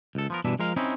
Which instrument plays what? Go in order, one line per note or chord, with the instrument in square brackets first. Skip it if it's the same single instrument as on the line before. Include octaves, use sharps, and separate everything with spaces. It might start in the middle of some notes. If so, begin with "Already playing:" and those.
[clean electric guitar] C#2 A4
F3 B3 A#4
G2 B2 E3 D4 E5
F3 G#3 A#4 F5
C4 C#4 D#4 E4